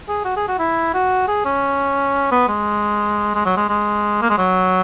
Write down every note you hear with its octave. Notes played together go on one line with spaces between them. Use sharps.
G#4
F#4
G#4
F#4
E4
F#4
G#4
C#4
B3
G#3
G#3
F#3
G#3
G#3
A#3
G#3
F#3